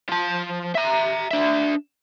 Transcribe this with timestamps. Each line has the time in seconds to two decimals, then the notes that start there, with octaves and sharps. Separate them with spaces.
0.09 F3 A5
0.75 E5 A#5
1.31 D4 E5